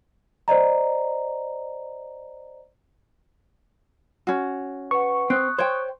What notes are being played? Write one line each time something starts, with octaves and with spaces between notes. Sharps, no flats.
C5 D5 D#5 A#5
C#4 F#4
B4 F#5 C#6
C4 D#6 F#6
C5 C#5 G5